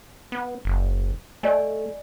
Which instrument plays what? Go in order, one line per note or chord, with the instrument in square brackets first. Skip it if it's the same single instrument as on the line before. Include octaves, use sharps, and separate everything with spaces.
[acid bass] B3
F#1
[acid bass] A3 [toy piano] D5 D#5 G#5